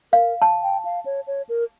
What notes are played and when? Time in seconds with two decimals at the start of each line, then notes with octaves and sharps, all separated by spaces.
0.13 A#4 F5
0.42 A5
0.62 G5
0.85 F5
1.05 C#5
1.27 C#5
1.49 A#4